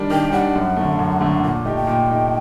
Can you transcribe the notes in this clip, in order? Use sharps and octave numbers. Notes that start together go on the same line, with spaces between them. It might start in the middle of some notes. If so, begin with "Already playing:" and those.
Already playing: D#3 G3 D4
D#3 G5
G3 D4 F#5
F#2
D3 A3
F#2
D3 A3
A#2 F#5
A3 D#4 G4 G5
G5
A#2
A3 D#4 G4